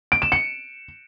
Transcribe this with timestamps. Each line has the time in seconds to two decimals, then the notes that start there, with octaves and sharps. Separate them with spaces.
0.12 D7
0.22 E7
0.32 C#7